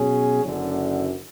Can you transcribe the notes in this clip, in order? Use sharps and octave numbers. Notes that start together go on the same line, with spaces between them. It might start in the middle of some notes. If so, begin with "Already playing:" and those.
Already playing: B2 F#3 C#4 G#4
F#1 F#2 D3